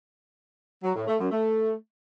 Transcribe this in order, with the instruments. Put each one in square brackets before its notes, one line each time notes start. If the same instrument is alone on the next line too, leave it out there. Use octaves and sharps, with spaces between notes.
[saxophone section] F#3
A2
A3
F#2
A3